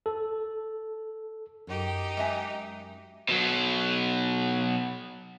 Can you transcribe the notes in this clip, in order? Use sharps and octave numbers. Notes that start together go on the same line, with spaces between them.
A4
F#2 D#4 G4
G#3 E5 G#5
B2 F#3